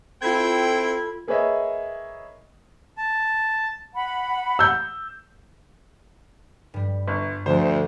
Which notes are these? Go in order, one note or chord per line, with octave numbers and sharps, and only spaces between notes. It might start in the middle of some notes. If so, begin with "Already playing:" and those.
C4 E4 F4 A4 G5 B5 G#6
A#3 G#4 B4 C#5 D#5 E5
A5
F#5 B5
E6 G6
G2 G3
G1
D2 D3 F3 D4 C5